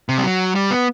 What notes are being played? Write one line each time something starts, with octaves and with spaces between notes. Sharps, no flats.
C3
G3
F#3
G3
B3